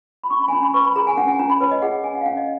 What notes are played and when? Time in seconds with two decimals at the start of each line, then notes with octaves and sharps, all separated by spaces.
0.24 B5
0.30 C#4 C#6
0.42 B5
0.48 G#5
0.52 C#4 A#5
0.63 B5
0.74 B4 C#6
0.85 B5
0.96 G#4 A#5
1.07 G#5
1.17 C#4 F#5
1.28 G#5
1.39 C#4 A#5
1.50 B5
1.61 B4 C#5
1.71 D#5
1.82 G#4 F#5
1.93 F#5
2.04 C#4 G#5
2.15 F#5
2.21 F5
2.25 C#4 F#5
2.37 D#5